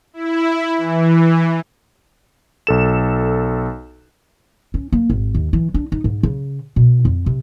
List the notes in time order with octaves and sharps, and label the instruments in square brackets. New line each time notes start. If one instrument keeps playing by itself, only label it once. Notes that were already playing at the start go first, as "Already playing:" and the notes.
[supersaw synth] E4
E3
[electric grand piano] B1 A4 E7
[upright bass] C#4
A#3
G#1
D#2
E3
D4
D#4
G#2
C#3
B2
F2
C3